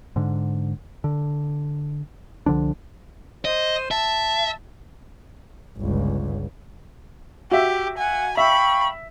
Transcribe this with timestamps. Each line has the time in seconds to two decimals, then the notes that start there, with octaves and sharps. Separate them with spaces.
0.16 G#2 D3
1.04 D3
2.46 C2 D3 F3 D4
3.45 C5 D#5
3.91 E5 A5
5.78 G1 C#2
7.51 F#4 G4 E5
7.98 F5 F#5 G#5
8.37 E5 F5 G5 B5 C#6